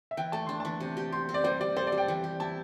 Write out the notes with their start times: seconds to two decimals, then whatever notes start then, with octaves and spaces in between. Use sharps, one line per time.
0.11 E5
0.17 E3 G5
0.32 A3 A5
0.47 D4 C6
0.60 E3 A5
0.80 C3
0.97 G4
1.12 G4 C6
1.29 C4
1.34 D5
1.44 G3 C5
1.61 G3 D5
1.76 A4 C5
1.87 D5
1.92 G3
1.98 G5
2.08 E3
2.24 G4
2.40 E4 A5